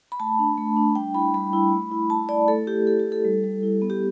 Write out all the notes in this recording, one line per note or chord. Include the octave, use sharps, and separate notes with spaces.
B5
A3 A5
D4
A3
D4
G3 G5
E4 B5
G3 B5
E4
A3
E4
A3 A5
E4 D5
A3 A4
E4 G4
A3 A4
G4
E4
A4
G3
G3
E4
B3
G4